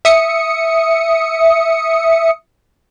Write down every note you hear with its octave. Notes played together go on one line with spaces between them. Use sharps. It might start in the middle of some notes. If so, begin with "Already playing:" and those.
E5 D#6 C#7